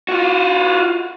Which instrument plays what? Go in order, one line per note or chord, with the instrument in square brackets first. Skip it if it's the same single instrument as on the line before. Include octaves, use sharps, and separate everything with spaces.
[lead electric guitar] F4 F#4